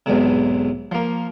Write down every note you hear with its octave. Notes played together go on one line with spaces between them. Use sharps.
B1 E2 G#2 C3
F3 A#3